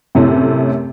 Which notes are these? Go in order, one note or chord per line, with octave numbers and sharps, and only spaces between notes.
F#2 A2 C3 A3 C#4